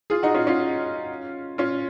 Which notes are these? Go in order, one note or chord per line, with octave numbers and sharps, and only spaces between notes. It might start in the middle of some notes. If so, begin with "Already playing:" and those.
F4 G#4
D#4 F#4
C#4 F4
C#4 F4
C#4 F4